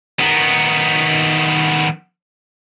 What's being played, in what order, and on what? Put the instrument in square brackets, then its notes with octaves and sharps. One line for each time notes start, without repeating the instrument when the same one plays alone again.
[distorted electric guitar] D#3 B3